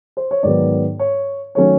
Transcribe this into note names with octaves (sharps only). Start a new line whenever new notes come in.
C5
C#5
G#2 D#3 F#3 B3 D5
C#5
D#3 F#3 A3 C#4 C#5